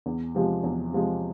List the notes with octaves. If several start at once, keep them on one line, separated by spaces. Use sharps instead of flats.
E2
C3 F3 G#3
E2
C3 F3 G#3